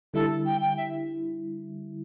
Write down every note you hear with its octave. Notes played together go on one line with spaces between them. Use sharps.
D3 G3 E4 A4
G5
G5
E5